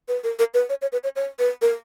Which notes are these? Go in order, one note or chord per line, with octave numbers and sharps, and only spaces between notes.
B4
A#4
A#4
B4
C#5
C#5
B4
C#5
C#5
B4
A#4